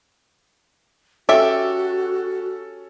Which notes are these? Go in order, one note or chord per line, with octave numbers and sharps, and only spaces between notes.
C#4 F#4 G4 A4 E5